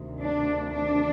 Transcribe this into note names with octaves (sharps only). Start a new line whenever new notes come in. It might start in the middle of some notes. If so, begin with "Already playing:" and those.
Already playing: D2 C3 D#3
D4
D4